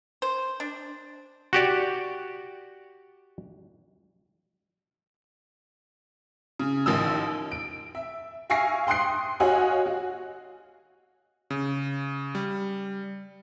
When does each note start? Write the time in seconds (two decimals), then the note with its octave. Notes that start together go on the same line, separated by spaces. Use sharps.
0.22 C5
0.60 D4
1.53 F#4 G4 D5
6.60 C#3
6.86 A1 D#3 F3 D#6 E6
7.51 D7
7.95 E5
8.50 E5 F5 G#5 C#6 A#6 C7
8.87 G5 C6 D#6 F#6 C7
9.40 F#4 C#5 D#5 F5 G#5
9.86 F#4
11.50 C#3
12.35 G3